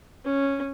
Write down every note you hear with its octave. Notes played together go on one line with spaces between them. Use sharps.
C#4